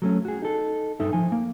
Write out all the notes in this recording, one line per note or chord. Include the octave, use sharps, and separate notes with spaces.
F#3 A3 C#4
F#4 G#4
D#4 A4
G2 D#4 A4 E5
F3 G#5
A#3